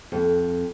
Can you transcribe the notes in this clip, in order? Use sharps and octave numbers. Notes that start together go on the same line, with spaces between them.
F2